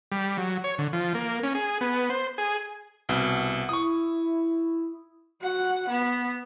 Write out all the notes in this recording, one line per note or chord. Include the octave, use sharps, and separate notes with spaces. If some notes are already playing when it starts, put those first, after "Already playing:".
G3
F#3
C#5
D3
F3
A#3
C#4
G#4
B3
C5
G#4
C2 B2
E4 C#6 D#6
F#4 F#5
B3